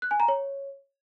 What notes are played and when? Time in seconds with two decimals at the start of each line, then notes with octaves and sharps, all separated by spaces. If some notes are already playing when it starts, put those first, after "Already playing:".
0.02 F#6
0.11 G#5
0.20 A#5
0.28 C#5